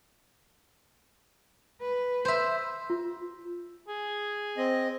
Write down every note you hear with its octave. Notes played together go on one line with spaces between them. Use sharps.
B4
C5 E5
F4
G#4
C4 D#5